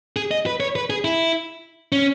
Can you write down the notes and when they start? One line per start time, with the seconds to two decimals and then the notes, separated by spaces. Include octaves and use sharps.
0.16 G#4
0.31 D#5
0.46 B4
0.60 C#5
0.75 B4
0.90 G#4
1.05 E4
1.92 C#4